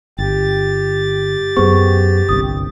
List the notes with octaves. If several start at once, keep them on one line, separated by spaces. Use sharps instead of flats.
G1 G4 A6
F#2 B3 G#4 C5 C#6
G1 C2 D#6